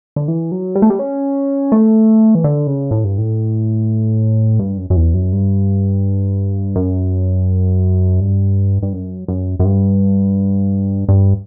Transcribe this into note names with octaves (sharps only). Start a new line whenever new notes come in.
D3
E3
F#3
G3
A3
G3
C#4
A3
E3
D3
C#3
A2
G2
A2
G2
F#2
F#2
E2
F#2
G2
F#2
G2
G2
F#2
F#2
F#2
G2
G2